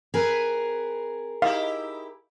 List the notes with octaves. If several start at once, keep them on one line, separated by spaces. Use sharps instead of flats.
C4 G#4 A#4 B4
D#4 E4 G4 F5